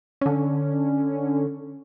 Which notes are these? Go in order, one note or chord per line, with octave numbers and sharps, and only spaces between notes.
D3 C#4